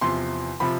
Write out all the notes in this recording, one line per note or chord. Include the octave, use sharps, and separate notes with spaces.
E2 C3 F3 C6
C3 F3 B5